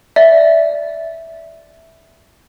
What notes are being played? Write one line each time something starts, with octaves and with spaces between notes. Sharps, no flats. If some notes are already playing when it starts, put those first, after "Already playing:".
D5 E5